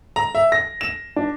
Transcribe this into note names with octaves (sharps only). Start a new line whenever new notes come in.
A#5
E5
A#6
E7
D4